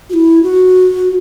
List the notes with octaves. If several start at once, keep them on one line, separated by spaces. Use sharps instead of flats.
F#4
E4
F#4